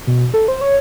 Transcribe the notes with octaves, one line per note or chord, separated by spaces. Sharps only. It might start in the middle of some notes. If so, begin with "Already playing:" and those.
B2
A4
C5
C#5